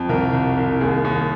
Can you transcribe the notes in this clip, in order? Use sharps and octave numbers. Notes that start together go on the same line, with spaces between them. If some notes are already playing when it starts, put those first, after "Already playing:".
Already playing: F2
C2 A#4
C2
C2
D#2 G#4
D#2